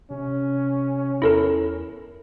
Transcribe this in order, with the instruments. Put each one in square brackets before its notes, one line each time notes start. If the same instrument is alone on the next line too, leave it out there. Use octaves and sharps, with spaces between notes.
[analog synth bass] C3 [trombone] C#4
[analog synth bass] E2 [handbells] E4 A4 A#4